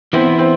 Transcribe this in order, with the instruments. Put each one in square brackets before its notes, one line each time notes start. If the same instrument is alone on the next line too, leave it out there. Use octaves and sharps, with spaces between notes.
[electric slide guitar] E3 B3 E4 [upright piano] C4
[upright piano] C4